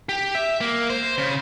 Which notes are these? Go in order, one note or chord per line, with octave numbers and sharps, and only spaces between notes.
G4
E5
A#3
C5
C#3